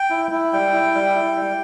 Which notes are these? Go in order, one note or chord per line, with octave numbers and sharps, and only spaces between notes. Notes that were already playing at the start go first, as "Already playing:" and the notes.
Already playing: G5
E4
E4
G3 G5
E4
G3
E4
G3